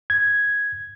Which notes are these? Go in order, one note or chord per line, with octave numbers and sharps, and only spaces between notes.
G#6